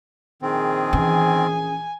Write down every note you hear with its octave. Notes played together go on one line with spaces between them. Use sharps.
A#1 D#3 C4 G#4
E3 C#4 G#5